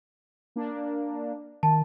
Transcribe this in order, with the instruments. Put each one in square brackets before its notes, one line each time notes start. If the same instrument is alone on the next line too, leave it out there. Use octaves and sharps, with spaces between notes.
[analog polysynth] A#3 D4
[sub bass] D#3 [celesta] A5